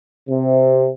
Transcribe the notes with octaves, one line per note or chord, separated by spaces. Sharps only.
C3